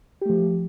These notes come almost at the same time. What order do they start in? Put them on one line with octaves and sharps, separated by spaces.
G4 A3 F3